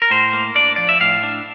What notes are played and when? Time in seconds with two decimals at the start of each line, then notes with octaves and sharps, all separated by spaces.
0.02 A#4
0.10 A2 C5
0.33 A#3
0.55 D4 D5
0.76 F3 D5
0.89 E5
1.00 A2 F5
1.23 D4